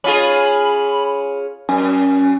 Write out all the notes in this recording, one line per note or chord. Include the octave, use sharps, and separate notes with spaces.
C#4 F4 G#4 B5
F#2 C#4